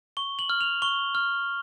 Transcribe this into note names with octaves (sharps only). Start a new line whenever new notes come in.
C#6 G7
F#7
F6
F7
C#6 G7
F6